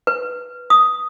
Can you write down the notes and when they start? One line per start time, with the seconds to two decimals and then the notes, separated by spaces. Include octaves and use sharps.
0.07 B4
0.70 D#6